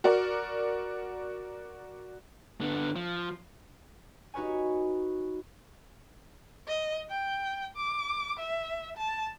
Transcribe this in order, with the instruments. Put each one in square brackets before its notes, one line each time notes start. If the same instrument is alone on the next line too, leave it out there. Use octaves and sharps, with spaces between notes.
[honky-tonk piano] F#4 A#4 D5
[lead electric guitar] D3 B3
F3
[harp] D#4 F#4 B4 C#5 G#5
[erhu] D#5
G5
D6
E5
A5